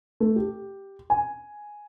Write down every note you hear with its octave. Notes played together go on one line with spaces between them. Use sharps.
A3
G4
G#5